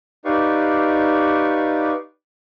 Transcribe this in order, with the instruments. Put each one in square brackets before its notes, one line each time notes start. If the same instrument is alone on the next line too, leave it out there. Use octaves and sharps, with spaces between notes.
[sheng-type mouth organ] D#4 G4 B4 D5 F5 C#6